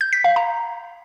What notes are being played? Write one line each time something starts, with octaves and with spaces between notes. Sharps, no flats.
G6
B6
F5
A#5